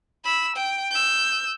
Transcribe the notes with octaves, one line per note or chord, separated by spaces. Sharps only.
B5 E6
G5
E6 G6